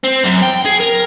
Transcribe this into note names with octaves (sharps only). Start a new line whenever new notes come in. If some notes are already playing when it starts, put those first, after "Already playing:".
C4
F#2
G5
G#4
A#4